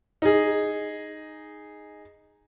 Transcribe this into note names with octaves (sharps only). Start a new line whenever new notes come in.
D#4 G#4